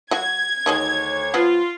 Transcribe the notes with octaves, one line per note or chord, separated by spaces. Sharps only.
F#3 F#4 G#6
D2 D#3 F#3 G#3 C#5
F3 B3 F4 F#4